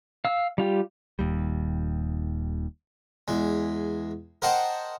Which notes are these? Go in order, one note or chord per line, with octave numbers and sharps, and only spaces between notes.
F5 E6
G3 F4 G4
D#1 D#2 G3
E2 G#3
A#4 C5 D#5 F#5 G5 A5